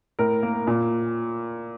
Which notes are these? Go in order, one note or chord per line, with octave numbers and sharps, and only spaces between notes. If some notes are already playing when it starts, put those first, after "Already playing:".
A2 A#4
A#3
A#2